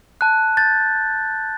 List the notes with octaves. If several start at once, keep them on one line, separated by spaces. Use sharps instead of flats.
A5 F#6
G6 A6